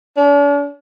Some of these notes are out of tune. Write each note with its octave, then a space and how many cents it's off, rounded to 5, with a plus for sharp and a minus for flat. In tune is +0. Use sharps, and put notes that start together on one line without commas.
D4 -45